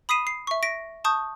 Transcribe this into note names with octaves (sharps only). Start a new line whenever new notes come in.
B5 D#6 B6 C7 D#7 E7
C7
E5 C#6
A#6 B6 D7
A5 C#6 D#6 G6